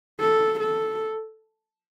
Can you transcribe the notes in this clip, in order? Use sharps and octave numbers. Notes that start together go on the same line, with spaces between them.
A4
A4